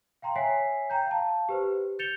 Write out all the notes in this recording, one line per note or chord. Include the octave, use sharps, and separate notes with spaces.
F5 G5 A#5 C6
C#5 E5 G#5 B6 C7
G5 A#5 G6
F5 A5
G4 B4 C5
G6 A6 C#7 E7 F7 G7